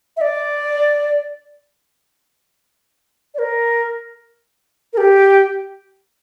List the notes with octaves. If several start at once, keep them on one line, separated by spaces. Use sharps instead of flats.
E5
D5
D5
A#4
A#4
G4